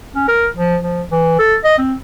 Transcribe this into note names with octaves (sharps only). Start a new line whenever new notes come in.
C#4
A#4
F3
F3
E3
A4
D#5
C4